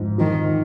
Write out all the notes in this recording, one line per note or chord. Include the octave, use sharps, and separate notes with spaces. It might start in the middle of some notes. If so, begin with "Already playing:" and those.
Already playing: G#2 F3
D#3 F3